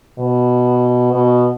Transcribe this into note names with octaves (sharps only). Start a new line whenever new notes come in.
B2
B2